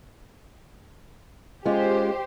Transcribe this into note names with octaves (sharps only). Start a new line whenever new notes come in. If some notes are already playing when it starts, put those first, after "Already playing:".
G#3 C#4 F4 G4 C5